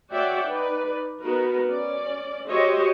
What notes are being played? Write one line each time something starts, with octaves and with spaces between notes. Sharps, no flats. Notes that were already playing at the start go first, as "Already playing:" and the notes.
F#4 C#5 D5 E5 F#5 G5
D#4 B4 D5
B3 D#4 F#4 A#4 B4
C#4 D5
F#4 G4 C5 C#5 D#5 E5